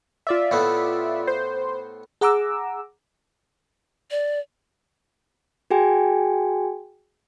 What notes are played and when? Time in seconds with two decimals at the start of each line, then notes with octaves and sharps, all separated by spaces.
0.27 F4 D5 E5
0.51 A2 A3 B3
1.27 C5
2.21 G#4 F#5 A#5 D6 E6
4.11 D5
5.71 F#4 G#4 G5 G#5